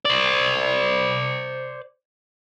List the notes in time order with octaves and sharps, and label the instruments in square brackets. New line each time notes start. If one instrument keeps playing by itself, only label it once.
[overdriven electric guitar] C5 D5